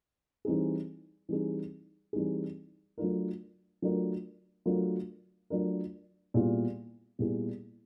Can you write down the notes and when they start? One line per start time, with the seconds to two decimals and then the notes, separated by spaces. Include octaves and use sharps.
0.45 E3 G3 C4 D#4 G#4
1.29 E3 G3 C4 D#4 G#4
2.13 E3 G3 C4 D#4 G#4
2.98 F#3 A3 D4 F4 A#4
3.82 F#3 A3 D4 F4 A#4
4.66 F#3 A3 D4 F4 A#4
5.50 F#3 A3 D4 F4 A#4
6.34 A#2 G3 B3 E4 G#4
7.19 A#2 G3 B3 E4 G#4